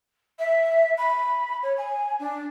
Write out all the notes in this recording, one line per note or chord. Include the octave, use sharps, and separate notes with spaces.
E5
B5
C#5
G#5
D4